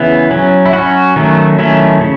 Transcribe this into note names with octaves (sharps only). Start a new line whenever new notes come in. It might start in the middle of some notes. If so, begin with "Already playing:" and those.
Already playing: C#3 E3 B3 E4
F#3 C#4
E4
F#3 C#4 F#4
D#3 F#3 A3 C#4
D#3 F#3 A3 C#4 E4
C#3